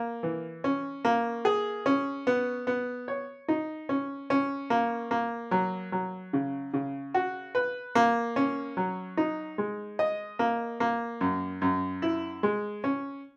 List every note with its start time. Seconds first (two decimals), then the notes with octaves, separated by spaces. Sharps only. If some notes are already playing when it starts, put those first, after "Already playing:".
Already playing: A#3
0.23 E3
0.64 C#4
1.05 A#3
1.45 G#4
1.86 C#4
2.27 B3
2.67 B3
3.08 C#5
3.48 D#4
3.89 C#4
4.30 C#4
4.70 A#3
5.11 A#3
5.51 F#3
5.92 F#3
6.33 C#3
6.74 C#3
7.14 F#4
7.55 B4
7.95 A#3
8.36 C#4
8.77 F#3
9.17 D#4
9.58 G#3
9.99 D#5
10.39 A#3
10.80 A#3
11.21 F#2
11.62 F#2
12.02 E4
12.43 G#3
12.84 C#4